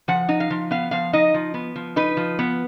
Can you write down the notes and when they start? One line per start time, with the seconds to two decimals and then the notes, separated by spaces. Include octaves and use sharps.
0.08 F3 F#5
0.29 D#4
0.40 F5
0.50 F3
0.71 B3 F5
0.91 F3 F5
1.13 D#4 D#5
1.34 F3
1.54 B3
1.76 F3
1.96 D#4 B4
2.17 F3
2.39 B3